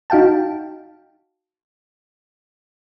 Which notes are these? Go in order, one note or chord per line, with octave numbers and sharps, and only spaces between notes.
D#4 F#4 F5 G5 A5